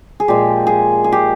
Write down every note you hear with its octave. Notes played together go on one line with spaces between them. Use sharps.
G#4
A#2 F3 G#3 G4
G#4
G#4
G4